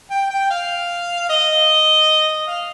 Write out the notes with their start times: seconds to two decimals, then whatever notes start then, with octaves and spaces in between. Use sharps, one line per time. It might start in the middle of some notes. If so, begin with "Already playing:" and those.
0.11 G5
0.30 G5
0.50 F5
1.30 D#5
2.47 F5